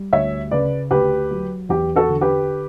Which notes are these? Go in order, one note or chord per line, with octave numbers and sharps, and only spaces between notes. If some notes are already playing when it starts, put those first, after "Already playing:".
Already playing: G3
D2 C#5 E5
C#3 B4 D5
D2 G4 B4
F#3
E2 G4
F#4 A4
D3
G4 B4